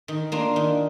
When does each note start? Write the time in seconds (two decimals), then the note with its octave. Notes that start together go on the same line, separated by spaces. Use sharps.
0.08 D#3
0.32 A#3 D4 F4
0.56 D#3